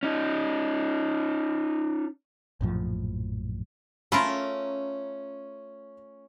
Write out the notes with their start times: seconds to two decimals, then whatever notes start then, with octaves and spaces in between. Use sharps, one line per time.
0.03 C#4 D#4
2.61 A#1 F#2 A2 F3
4.12 A3 C#4 F4 A#4 B5 C6